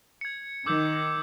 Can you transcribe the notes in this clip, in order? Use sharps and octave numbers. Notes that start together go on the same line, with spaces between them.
G#6 C#7
D#3 D6 E6 G6